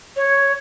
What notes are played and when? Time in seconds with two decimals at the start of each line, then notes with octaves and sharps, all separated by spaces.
0.16 C#5